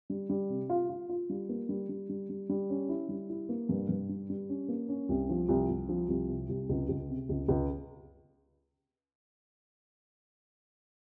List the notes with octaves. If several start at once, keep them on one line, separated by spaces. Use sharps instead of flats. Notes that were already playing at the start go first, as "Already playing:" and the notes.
G3
G3
C3
F4
F4
F4
G3
A#3
G3
G3
G3
G3
G3
C#4
E4
G3
E4
A#3
G2
G2
G3
G3
C#4
A#3
C#4
C2
F3
C2
C2
F3
C2
C3
C2
C#2
C#2
C3
C#2
C#2